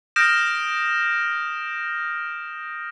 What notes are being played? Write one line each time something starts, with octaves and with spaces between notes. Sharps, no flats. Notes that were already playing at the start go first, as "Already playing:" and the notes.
D#6 F6 G6 A#6 D7 E7